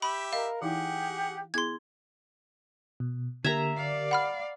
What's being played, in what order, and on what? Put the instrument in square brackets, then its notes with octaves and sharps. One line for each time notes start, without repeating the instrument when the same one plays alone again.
[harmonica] G4 E5 [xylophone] B5
[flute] A#4 [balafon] D#5 [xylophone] F5
[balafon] E3 D#4 E4 [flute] G4 [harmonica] G#4 F#5
[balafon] B3 E4 G#4 [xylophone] C6 G#6
[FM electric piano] B2
[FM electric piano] D3 G4 A#4 [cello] A#3 [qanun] E5 A#5 [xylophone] G#6
[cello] D5 F5
[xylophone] F#5 B5 F6